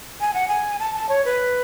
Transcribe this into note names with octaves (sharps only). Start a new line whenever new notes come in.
G#5
F#5
G#5
A5
A5
C#5
B4